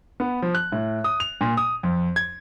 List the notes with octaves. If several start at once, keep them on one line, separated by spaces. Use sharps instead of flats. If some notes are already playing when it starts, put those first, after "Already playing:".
B3
F3
F#6
A2
D#6
F7
A#2
D#6
F2
G#6